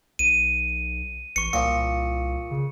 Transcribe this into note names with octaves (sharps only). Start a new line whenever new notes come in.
B1 D#7
A1 C#6 C#7
C2 A#2 F3 C#7
C#3